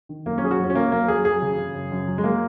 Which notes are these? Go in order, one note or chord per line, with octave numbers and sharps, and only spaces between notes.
D#3
F#2 A#3
C#4
F#3 G#4
F#4
F#2 C#4
C#4
F#3 A#3
F#2 A#3
F#3 G#4
F#2 G#4
C#3
C#3
F#2
F#2
F#3
G#3
F#3 A#3